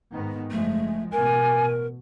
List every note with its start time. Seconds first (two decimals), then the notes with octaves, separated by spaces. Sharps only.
0.12 G#2 D#3 B3
0.51 F#1 F3 G#3 A3
1.12 A1 B2 A#4 G#5